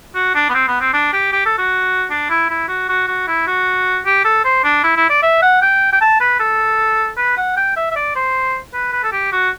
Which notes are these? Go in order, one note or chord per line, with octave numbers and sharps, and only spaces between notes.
F#4
D4
B3
C4
B3
C4
D4
G4
G4
A4
F#4
D4
E4
E4
F#4
F#4
F#4
E4
F#4
G4
A4
C5
D4
E4
E4
D5
E5
F#5
G5
G5
A5
B4
A4
B4
F#5
G5
E5
E5
D5
C5
B4
B4
A4
G4
F#4